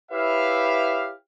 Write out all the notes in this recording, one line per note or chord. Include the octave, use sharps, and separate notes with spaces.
E4 G4 B4 C#5 E5 F5